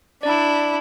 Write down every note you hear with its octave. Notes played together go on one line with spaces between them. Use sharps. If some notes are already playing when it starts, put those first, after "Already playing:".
D4 E4 D5